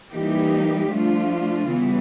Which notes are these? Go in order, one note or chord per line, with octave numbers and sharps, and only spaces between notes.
E3 G3 A#3 D#4 G4
F3 A3 D4 F4
C#3 E3 G3 B3